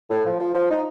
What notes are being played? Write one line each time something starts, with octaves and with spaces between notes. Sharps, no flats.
A2
F3
F3
F3
D#4